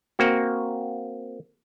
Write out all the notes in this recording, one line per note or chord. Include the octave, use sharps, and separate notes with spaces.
A#3 C4 F#4